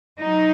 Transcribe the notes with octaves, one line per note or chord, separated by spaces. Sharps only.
F#3 D#4